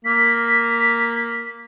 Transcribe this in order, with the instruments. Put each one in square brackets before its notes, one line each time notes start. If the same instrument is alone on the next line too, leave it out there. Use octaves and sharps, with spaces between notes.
[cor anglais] A#3 [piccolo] B6